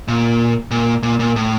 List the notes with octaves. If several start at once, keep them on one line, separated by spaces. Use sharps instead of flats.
A#2
A#2
A#2
A#2
A2